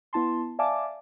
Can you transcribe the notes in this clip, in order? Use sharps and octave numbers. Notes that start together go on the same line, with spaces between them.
B3 E4 A5 C6
D5 E5 F5 G#5 A5 D6